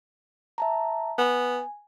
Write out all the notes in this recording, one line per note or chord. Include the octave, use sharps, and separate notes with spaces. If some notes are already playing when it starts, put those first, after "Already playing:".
E5 A5 A#5
B3 G#5